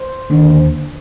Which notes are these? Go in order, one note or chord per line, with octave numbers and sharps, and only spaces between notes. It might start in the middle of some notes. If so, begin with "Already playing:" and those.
Already playing: C5
D#2 D3